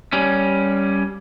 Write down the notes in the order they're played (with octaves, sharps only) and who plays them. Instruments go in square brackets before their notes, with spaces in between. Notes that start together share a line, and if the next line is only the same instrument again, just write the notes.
[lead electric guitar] G3 C#4